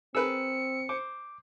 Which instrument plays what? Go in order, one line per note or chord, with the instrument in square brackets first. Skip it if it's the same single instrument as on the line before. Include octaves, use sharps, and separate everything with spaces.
[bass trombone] C4 [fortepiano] G#4 A#4 B4 [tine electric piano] E6 [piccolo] C#7
[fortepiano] C5 [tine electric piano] D6